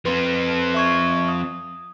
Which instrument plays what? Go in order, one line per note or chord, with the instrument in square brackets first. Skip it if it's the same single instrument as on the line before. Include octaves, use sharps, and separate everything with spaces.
[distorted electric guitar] F3 C4 [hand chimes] B4 C6
[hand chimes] E5 C#6 G#6
D#6